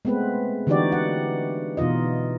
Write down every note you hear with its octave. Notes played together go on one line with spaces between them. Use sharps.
G#3 A3 B3 C4 B4
D3 E3 D#4 F#4 G4 D5
F#5
B2 E3 D#4 F4 D#5